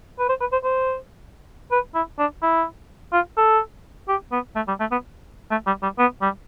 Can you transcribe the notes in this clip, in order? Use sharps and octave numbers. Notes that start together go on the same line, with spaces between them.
B4
C5
B4
C5
C5
B4
E4
D4
E4
F4
A4
G4
B3
A3
G3
A3
B3
A3
G3
G3
B3
G3